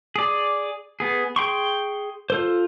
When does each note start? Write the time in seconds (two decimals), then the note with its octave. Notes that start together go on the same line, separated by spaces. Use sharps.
0.16 G#4 D5
1.00 B3 G#4
1.36 G#4 G5 C6 C#6
2.30 F4 A4 C5